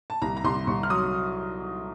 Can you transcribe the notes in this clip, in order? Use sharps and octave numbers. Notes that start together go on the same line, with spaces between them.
A5
C2 A#5
A#5
C2 C6
C2 C#6
F6
F#3 D#6